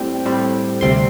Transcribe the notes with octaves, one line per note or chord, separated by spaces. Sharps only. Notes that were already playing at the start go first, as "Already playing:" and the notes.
Already playing: A2 G3 C4 G5
A2 G3 C4
D2 C3 G3 C4 C6